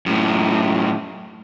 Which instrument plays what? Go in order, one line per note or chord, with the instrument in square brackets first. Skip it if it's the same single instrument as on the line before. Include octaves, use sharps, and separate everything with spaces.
[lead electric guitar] F#2 A2